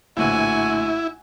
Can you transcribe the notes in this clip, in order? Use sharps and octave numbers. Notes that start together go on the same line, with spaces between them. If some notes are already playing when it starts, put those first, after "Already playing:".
A#1 A2 D3 E4 F#4 G#5